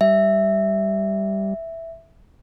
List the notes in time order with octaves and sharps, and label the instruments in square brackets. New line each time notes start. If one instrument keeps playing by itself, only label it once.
[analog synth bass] G3 [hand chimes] E5